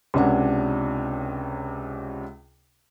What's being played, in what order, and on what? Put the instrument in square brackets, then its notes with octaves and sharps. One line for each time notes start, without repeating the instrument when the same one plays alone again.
[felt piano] C#2 C3 C#4 D4 F#5